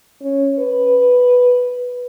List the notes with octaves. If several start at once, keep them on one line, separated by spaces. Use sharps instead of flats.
C#4
B4